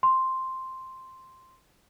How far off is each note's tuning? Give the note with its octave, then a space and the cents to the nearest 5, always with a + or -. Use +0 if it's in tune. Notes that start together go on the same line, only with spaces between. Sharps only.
C6 +0